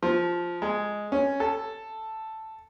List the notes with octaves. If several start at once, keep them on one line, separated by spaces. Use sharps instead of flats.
F3
G#3
C#4
A4